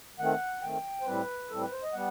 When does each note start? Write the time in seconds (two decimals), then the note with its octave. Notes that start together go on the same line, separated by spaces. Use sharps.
0.19 D#3 A3 C4 F#5
0.62 D#3 A3 C4 G5
1.01 C5
1.06 A2 G3 C4 B4
1.50 A2 G3 C4 A4
1.61 B4
1.72 C5
1.83 D#5
1.93 G3 B3 F#5